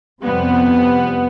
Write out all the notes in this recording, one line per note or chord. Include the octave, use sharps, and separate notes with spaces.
F2 C3 G3 B3